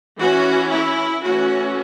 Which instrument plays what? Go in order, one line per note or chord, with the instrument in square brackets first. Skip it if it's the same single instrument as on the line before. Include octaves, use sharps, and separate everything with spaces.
[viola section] E3 C#4 F#4
E4
E3 A3 C#4 F#4